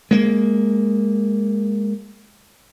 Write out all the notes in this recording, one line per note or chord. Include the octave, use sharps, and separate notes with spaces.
G#3 A#3